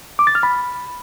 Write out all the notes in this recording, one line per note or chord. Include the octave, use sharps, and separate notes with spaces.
D6
A6
F6
B5